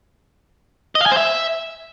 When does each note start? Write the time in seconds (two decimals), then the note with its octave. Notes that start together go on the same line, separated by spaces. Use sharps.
0.95 D#5
1.01 F5
1.06 G#5
1.12 C5
1.17 E5